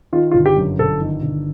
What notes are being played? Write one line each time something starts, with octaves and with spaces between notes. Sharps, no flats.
D#3 F4
F4
G1
G4
F#2
G1 A4
D#3
G1